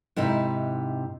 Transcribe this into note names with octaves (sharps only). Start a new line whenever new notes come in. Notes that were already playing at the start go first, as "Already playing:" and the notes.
G#2 C3 D#4 E4